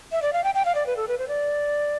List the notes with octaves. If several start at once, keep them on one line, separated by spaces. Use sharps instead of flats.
E5
D5
F5
G5
G5
F5
D5
B4
A4
B4
C5
D5